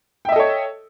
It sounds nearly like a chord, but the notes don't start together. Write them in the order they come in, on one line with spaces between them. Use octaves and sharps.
G5 E5 D#5 A4 C#5